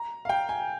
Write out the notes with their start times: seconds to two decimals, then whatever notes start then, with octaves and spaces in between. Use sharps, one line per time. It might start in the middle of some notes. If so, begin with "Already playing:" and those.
Already playing: A#5
0.25 F5
0.29 G5
0.49 G#5